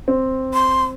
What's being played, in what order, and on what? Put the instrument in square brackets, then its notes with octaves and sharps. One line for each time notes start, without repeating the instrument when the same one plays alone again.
[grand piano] C4
[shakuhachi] C6